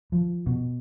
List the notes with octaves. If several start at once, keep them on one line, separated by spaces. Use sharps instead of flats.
F3
B2